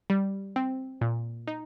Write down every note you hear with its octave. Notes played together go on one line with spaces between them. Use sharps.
G3
C4
A#2
D#4